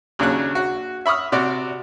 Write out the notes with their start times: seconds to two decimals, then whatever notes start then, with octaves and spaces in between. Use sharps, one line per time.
0.19 D#2 C#3 F#3 D4 C#5 F#6
0.55 F#4
1.06 E5 B5 C#6 D#6 F6
1.32 C3 F#4 D5